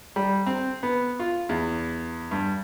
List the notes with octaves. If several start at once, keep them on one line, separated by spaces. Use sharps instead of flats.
G3
C4
B3
F4
E2
G2